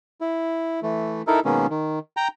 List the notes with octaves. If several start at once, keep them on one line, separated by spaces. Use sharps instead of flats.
E4
E3 A3
D#4 E4 A4 A#4
B2 D#3 G#3 A#3 B3 C#4
D#3
G5 A#5